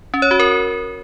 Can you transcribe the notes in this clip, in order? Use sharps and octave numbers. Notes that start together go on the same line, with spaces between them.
C#4
C#5
F#4
A#4